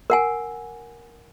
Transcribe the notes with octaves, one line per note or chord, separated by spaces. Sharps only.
A#4 F#5 G#5